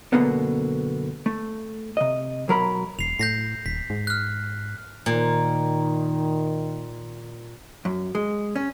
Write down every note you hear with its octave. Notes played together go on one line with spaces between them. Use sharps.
F#2 B2 D3 A#3 B3
A3
C3 D#5
B1 F#3 A#4 B5
E1 C7 F7
A2 G6 A#6 C7
D#1 B6
G#2
F6 F#6
A#2 D#3
F#2
G#3
C#4